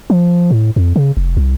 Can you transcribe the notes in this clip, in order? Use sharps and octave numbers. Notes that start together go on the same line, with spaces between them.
F3
A2
F2
C#3
F1
C2